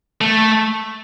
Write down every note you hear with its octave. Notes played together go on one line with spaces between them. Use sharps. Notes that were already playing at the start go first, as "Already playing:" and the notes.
A3